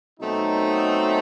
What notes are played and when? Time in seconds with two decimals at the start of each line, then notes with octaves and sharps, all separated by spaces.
0.20 B2 F#3 A3 C4 D#4